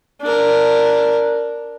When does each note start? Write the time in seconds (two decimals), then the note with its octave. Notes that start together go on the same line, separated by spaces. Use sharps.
0.22 D4 A#4